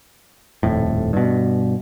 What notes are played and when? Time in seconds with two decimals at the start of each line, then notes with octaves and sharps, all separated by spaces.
0.63 D#1 F2 A2
1.13 G2 B2